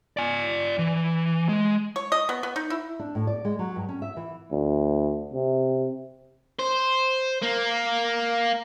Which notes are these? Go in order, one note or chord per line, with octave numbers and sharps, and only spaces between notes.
D5 G#5
E3
G#3
C#5
D#5
B3
B3
D#4
E4
D4
A2
D5
G#3
F#3
G2
C#4
E5
E3
D2
C3
C5
A#3